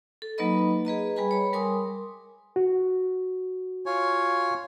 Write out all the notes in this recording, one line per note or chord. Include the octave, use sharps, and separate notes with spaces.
A4
F#3 A#3 D#4 B4 D#5 B5
G#4 B4 D#5 A#5
G3 G#4 B4 G#5 B5
C#5 B5
G3 A#4 G#5 C6 D6 D#6
F#4
F4 C#5 G#5